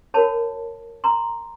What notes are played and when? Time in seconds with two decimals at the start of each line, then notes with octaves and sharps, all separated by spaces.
0.14 F#4 A#4 C#5 A5 B5
1.04 A#5 C6